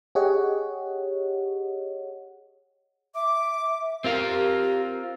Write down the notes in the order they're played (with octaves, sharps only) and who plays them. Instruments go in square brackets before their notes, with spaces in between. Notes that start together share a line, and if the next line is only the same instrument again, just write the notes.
[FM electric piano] G4 G#4 C#5 D#5 F#5
[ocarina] E5 [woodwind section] D6
[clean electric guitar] C4 F4 F5 [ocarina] G4 [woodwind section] A#4